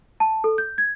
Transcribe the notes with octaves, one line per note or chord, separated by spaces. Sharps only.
A5
A4
G6
G#6